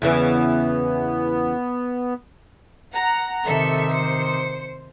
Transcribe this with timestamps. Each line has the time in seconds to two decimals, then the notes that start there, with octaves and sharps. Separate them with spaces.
0.02 E2 C#3 E3 B3
2.92 F#5 A#5
3.46 C3 D#3 A4 E5 C#7
3.91 C5 C#7